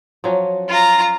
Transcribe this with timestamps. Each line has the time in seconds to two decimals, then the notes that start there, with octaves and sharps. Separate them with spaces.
0.24 F3 F#3 C#4
0.69 F4 A#5